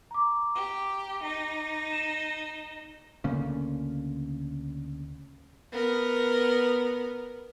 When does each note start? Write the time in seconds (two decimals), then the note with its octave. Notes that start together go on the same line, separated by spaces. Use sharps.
0.11 A#5 D6
0.54 G4
1.23 D#4
1.92 E7
3.24 D2 C#3 A#3 C#4
5.72 B3 A#4